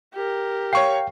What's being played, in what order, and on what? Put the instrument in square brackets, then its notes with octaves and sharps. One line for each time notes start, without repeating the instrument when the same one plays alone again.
[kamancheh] G4 A#4
[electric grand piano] C#5 C#6 C7 [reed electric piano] F5 G5